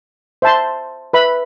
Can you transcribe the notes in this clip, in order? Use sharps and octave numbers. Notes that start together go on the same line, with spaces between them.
C5 E5 A5 C6
B4 E5 B5